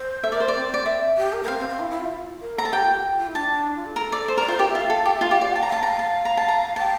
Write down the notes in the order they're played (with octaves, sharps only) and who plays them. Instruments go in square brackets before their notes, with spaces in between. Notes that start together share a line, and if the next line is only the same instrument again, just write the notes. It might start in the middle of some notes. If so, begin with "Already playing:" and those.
Already playing: [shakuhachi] C5
[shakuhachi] A4 [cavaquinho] E5
[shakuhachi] A#4 [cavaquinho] D5
[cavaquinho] C5
D5
[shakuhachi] C4
[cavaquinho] D5
E5
[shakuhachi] G4
A#4
A#3
[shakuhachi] C4 [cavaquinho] F5
[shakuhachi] C4
C4
E4
E4
F4
A#4
[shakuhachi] A4 [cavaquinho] A#5
[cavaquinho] A5
[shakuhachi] G4 [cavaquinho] G5
[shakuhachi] F4
G4
F4
E4
[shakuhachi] D4 [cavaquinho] A5
[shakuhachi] F4
A4
[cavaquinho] A#4
D5
C5
[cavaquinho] A#4 [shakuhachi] D5
[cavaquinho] F4 [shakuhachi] C5
[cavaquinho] G4 [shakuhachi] A#4
[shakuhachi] E5
[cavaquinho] F4
[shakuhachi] F5
[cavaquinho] A4
G4
[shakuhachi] E5
[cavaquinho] F4 [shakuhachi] F5
[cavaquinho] G4
D5
[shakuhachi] G5 [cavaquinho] A5
[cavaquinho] A#5
[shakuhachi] F5 [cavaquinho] A5
[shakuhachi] F5 [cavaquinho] A#5
[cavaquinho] A5
A#5
A5
A#5
[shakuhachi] G5 [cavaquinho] A5